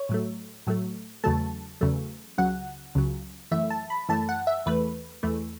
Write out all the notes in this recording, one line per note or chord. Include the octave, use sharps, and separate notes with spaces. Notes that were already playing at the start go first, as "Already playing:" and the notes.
Already playing: C#5
A2 F#3 A3
A2 F#3 A3
E2 C#3 F#3 A3 A5
E2 C#3 F#3 A3
C#2 C#3 F#3 F#5
C#2 C#3 F#3
F#2 E3 A3 E5
A5
B5
F#2 E3 A3 A5
F#5
E5
E2 E3 A3 B4
E2 E3 A3